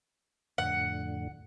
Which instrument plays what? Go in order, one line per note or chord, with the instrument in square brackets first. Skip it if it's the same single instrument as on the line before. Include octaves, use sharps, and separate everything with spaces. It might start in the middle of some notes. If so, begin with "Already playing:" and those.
[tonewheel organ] F2 A2 D3 [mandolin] F#5